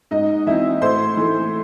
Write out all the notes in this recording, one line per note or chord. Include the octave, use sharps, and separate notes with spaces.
G#2 D#4 D#5
E3 C4 E4 E5
A2 C5 C6
E3 A3